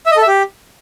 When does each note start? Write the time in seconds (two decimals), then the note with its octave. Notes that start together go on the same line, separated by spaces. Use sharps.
0.06 E5
0.11 D#5
0.17 A4
0.22 E5
0.27 G4